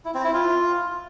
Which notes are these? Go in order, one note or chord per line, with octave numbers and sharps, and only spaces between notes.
E4
C4
E4
F4